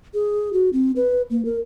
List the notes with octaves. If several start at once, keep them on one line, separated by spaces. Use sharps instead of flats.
G#4
F#4
C4
B4
A#3
A#4